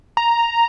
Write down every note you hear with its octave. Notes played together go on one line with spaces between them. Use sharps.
A#5